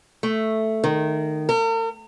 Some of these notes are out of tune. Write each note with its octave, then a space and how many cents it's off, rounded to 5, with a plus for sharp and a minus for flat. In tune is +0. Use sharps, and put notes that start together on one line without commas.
A3 +0
D#3 -15
A#4 -45